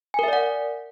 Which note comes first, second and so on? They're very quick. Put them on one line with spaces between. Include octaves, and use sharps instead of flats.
G#5 A#4 E5 D5 F#5